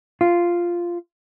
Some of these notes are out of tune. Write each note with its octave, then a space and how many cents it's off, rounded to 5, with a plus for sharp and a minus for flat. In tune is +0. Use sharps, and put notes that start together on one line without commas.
F4 -5